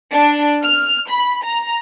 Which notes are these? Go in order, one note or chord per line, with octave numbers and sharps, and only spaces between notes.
D4
F6
B5
A#5